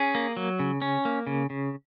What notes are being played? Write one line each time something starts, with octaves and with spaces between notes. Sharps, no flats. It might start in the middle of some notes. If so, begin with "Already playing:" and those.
Already playing: C#4 G#4
A#3
F#3
C#3
C#4
A#3
C#3
C#3